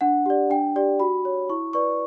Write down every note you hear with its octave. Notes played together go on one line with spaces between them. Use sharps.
D4 F#5
G4 D5
D4 G5
G4 D5
F#4 B5
C#5
E4 C#6
B4 D5 C#6